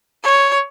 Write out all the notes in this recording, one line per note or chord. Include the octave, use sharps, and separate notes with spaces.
C#5